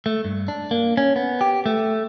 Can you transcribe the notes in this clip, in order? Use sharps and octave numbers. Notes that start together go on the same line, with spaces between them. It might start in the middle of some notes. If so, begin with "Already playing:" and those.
A3
G2
D4
A#3
C#4
B3
G4
A3